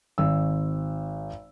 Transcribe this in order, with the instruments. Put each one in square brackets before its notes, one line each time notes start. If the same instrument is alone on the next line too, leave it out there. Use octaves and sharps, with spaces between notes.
[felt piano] G#1 E6